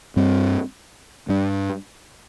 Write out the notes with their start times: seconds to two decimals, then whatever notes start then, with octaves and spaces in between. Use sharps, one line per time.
0.16 G2 G3 C4
1.29 G2 G3 D4